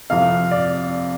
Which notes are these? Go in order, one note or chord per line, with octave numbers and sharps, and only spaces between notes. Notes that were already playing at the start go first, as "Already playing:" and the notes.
F2 C3 F3 F5
D5